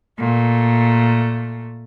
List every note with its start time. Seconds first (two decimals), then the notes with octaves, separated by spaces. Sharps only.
0.19 A#2 A3